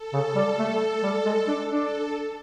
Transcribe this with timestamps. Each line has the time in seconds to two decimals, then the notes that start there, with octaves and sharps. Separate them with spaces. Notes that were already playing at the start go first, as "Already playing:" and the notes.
Already playing: A4
0.13 C#3
0.36 G3
0.59 A3
1.03 G3
1.25 G#3
1.48 D4
1.70 D4 A4